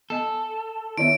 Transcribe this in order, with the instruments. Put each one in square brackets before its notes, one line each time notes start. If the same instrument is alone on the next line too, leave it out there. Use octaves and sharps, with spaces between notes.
[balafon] B3 D#5 G#5 [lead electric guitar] A4
[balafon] D#3 B3 [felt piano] E4 C#5 E5 [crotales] D7